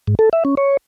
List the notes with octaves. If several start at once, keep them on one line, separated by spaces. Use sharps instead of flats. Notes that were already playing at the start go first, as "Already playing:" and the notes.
G#2
A4
E5
C#4
C#5